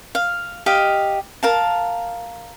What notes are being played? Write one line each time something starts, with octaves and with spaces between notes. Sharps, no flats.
F5
G4 D#5 F5
A#4 F5 A5